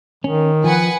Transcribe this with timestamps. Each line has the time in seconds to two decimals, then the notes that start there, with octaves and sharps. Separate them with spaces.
0.24 D#3 C#4
0.64 F3 B4 F#5 G#5